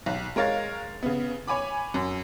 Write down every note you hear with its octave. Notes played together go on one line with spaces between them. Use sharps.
B1
G#3 A#4 C#5 F5 A6
C#3 B3
C#5 G#5 B5 D6
F#2